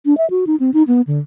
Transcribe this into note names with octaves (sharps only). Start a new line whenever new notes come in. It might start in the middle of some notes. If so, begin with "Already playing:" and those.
D4
E5
F#4
D#4
C4
D#4
B3
D3